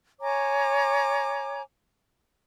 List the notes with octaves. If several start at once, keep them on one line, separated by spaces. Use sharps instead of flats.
C#5 G#5 A#5 D6